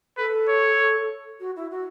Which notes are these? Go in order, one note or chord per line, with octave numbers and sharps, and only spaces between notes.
A4 B4
C#5
F#4
E4
F#4